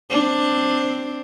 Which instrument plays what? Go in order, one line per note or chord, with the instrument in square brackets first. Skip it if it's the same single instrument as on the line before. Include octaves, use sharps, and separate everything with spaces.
[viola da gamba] C4 D4